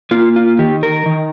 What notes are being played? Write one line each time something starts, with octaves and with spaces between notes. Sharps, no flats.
A#3 F4
F4
D#3 G4
A#4
D#3